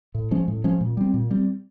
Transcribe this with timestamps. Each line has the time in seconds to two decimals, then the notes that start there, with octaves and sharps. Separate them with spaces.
0.15 A2
0.31 F3 G#3 C#4
0.48 A2
0.64 F3 G#3 C#4
0.81 A#2
0.97 G3 C4
1.14 A#2
1.31 G3 C4